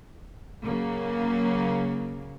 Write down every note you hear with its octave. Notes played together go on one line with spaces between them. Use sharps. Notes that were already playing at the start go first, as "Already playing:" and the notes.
C#3 F#3 A#3